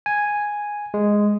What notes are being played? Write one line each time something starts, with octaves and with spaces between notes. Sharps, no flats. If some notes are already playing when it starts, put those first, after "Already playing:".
G#5
G#3